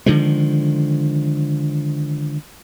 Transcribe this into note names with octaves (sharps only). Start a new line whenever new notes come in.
D3 D#3 F3 G#3